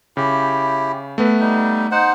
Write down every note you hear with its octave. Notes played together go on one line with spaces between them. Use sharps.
C#3 E4 G4
A3 B3 B4
G3 D#4
D#4 C5 F#5